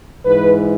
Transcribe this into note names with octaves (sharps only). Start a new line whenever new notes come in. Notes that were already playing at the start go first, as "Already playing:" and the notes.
G#2 E3 B4